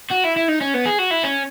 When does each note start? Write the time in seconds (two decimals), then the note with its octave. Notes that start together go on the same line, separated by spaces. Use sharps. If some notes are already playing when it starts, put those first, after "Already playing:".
0.11 F#4
0.25 E4
0.37 E4
0.49 D#4
0.61 C#4
0.74 B3
0.86 G#4
0.99 F#4
1.11 E4
1.24 C#4